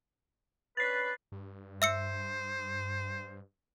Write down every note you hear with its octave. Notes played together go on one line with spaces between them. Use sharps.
C#4 D4 B4 A6 C7
G2
C5 E5 E6 C#7